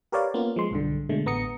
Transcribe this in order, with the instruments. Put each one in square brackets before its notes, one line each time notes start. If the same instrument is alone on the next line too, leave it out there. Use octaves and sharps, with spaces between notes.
[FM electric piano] G4 A#4 B4 C#5 D5 F5
A#3 B3 C#4 F4
F3 G#3 C6
B1 G2 D3
B2 D3 G#3 A3
A1 B3 A#5 D#6 C#7